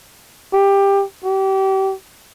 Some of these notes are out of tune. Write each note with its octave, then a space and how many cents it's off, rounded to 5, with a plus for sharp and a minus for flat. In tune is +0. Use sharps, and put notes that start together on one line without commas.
G4 +15
G4 -30